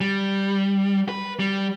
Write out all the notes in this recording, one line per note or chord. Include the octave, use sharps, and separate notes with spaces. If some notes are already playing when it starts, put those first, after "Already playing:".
G3
B4
G3